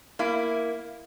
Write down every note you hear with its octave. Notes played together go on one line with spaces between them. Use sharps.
A#3 E4